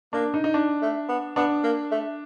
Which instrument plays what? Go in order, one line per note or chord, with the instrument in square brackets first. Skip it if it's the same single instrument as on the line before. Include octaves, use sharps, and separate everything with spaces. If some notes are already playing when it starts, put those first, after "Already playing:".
[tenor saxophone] A#3 [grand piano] D4
[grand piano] D#4
D#4
D4
[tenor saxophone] A3
B3
[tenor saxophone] B3 [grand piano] D4
[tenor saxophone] A#3
A3